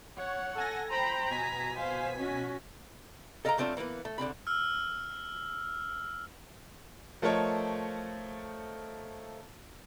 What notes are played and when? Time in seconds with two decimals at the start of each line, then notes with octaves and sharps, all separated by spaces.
0.18 C#5 F#5
0.55 A4 G#5 A#6
0.90 C5 G5 A#5 B5
1.30 B2 G#5 B6
1.77 C5 F5
2.18 C#4 F#4
3.45 A4 D#5 F5 G5 A5 A#5
3.58 F#3 A3 C4 D4 F4
3.77 E3 A#3 B3 B4
4.05 A3
4.18 C2 D3 C4 B5
4.47 E6 F6
7.22 F3 A3 A4 A#4 C#5 D#5